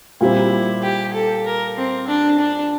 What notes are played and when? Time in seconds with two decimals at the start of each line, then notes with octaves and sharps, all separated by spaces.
0.21 A#2 G3 C4 E4
0.83 G4
1.14 A4
1.46 A#4
1.77 C4
2.08 D4
2.39 D4